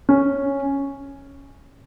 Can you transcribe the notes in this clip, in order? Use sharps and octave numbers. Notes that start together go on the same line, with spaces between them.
C#4